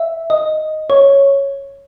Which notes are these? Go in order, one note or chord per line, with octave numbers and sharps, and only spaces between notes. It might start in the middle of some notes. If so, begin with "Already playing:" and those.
Already playing: E5
D#5
C#5